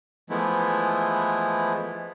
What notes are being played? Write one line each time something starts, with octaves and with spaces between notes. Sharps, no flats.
E3 F3 G#3 A3 B3 E4